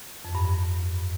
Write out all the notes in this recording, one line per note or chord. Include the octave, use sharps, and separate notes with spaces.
F2
G2
G2